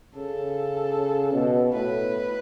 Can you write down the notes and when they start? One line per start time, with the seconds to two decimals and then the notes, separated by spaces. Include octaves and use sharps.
0.15 C#3 A4
1.33 B2
1.73 A2 B4